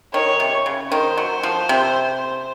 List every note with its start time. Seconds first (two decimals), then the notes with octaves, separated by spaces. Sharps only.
0.14 D#3 C#5
0.40 C3
0.66 C#3
0.91 D#3 C5
1.18 F#3
1.43 F3
1.69 C3